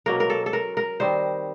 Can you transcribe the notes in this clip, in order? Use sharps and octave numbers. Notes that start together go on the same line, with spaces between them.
B2 F#3 A#3 C#4 A#4
A#4
A4
A4
A#4
A#4
D#3 G3 C4 C5